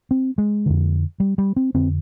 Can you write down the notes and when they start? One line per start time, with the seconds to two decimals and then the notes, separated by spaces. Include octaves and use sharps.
0.11 C4
0.38 G#3
0.66 F2 D3
1.20 G3
1.38 G3
1.56 C4
1.74 F2 D3 C4